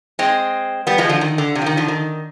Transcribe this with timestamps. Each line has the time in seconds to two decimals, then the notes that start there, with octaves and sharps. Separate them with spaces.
0.19 G#3 C4
0.87 G3 B3
0.98 F3 G#3
1.09 D3 F3
1.21 D#3
1.38 D3
1.55 C3
1.62 F3
1.66 D#3
1.77 D3 F3
1.88 D#3